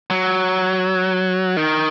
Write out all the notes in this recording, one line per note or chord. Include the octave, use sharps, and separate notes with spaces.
F#3
D#3